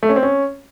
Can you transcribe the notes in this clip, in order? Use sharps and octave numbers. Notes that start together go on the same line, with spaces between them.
A3
C#4
C4
C#4